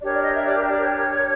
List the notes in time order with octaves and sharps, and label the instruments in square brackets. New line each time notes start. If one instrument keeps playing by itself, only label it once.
[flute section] D4 G4 A#4 C#5 D5
D5
D#5
E5
D5
C#5
D5
C#5